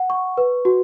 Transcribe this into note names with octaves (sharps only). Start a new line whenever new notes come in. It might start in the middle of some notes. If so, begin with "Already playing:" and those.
Already playing: F#5
C#6
B4
F#4